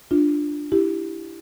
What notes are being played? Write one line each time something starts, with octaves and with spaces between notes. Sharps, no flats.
D4 F4
E4 G4